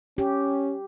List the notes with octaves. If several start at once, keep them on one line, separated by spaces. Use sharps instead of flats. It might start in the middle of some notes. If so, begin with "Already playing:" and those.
C#4 G4